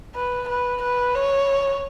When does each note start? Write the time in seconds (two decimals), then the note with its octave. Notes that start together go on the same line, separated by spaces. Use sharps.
0.15 B4
0.48 B4
0.82 B4
1.15 C#5